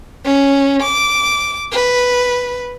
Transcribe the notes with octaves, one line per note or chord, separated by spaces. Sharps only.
C#4
D6
B4